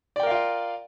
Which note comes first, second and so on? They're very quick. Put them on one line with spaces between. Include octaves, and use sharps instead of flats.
D5 G5 A#4 F5 F4